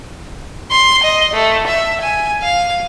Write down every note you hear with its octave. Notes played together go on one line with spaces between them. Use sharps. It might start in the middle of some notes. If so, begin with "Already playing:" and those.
C6
D#5
A3
E5
G#5
F5